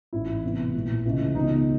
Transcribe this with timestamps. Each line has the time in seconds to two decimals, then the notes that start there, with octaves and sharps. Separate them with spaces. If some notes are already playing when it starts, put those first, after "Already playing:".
0.13 A1 G#2 E3 E4
0.44 E1 E2 C3 E3
0.74 A#1 A2 E3
1.06 C#2 C#3 E3
1.35 C#2 D#4
1.41 B2